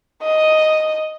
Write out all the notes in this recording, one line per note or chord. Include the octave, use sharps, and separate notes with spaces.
D#5